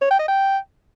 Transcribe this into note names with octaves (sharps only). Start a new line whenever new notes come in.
C#5
G5
D#5
G5